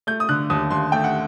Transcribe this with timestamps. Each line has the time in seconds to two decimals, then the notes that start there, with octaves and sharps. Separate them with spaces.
0.07 A3 G6
0.20 D#6
0.29 D3 F#6
0.50 D#2 D#6
0.70 D#2 C6
0.92 A3 G5
1.04 F#5